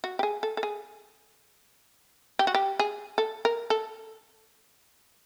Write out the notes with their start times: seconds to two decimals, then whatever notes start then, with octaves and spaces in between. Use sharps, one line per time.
0.04 F#4
0.19 G4
0.23 G#4
0.43 A4
0.57 A4
0.63 G#4
2.39 G4
2.47 F#4
2.54 G4
2.79 G#4
3.18 A4
3.45 A#4
3.70 A4